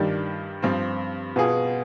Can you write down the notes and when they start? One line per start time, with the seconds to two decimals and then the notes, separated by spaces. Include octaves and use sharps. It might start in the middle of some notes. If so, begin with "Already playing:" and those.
Already playing: G2 D#3 G3 D4
0.62 G2 F3 C4
1.36 B2 B3 F4 G#4